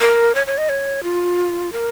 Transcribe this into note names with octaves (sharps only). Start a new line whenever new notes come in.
A#4
C#5
C#5
D#5
C#5
F4
A#4